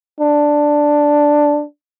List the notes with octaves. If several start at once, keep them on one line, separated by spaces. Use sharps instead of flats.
D4